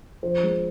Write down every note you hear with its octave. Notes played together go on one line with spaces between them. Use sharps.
F3 C5
G#3